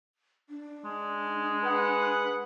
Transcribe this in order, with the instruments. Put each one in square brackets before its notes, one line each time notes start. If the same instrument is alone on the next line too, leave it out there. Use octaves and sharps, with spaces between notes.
[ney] D4
[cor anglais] G#3
[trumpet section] G#4 B4 F#5